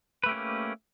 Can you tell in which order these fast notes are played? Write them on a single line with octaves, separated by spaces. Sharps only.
B4 A3 G4 C#4 A#3